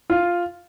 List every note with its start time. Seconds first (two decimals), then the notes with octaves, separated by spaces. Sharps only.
0.10 F4